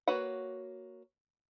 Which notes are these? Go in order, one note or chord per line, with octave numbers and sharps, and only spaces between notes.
A#3 F#4 B4 C#5 F#5